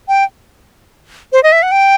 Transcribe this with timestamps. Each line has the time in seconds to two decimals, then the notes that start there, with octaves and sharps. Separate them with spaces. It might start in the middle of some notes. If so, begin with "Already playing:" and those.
0.08 G5
1.33 C5
1.43 D#5
1.52 E5
1.63 F#5
1.72 G5